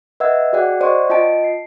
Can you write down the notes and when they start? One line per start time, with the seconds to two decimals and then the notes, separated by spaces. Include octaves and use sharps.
0.20 B4 D#5 E5 F#5 E6 G#6
0.53 F#4 G#4 D5 F#5 G5
0.80 C5 D5 D#5 F#5 C6 C#6
1.10 F4 D#5 G5 A5 D7
1.44 C7